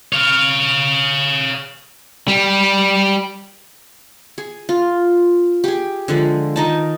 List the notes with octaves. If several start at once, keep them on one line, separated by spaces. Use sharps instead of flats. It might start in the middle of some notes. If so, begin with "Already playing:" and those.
C#5 F5
G3
G#4
F4
G4 G#4
D3 F3 G#3
D#3 D#4 A5